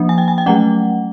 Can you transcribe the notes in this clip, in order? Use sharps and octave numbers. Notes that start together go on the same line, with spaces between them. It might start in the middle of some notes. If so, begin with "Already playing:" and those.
Already playing: F3 A#3 D4
G#5
G5
G#5
G5
F#3 A3 C#4 F#5